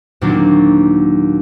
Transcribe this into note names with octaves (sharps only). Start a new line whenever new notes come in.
D#2 A#2 F#3 A#3 C4 D4